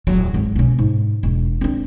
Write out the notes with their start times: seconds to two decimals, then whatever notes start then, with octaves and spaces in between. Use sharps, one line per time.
0.07 D1 F#3
0.34 G#1 E2
0.56 B2 C#4
0.79 G#2
1.23 E1
1.61 C4 D4